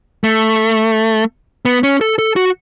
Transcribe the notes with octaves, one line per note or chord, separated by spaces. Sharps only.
A3
B3
C#4
A4
A4
F#4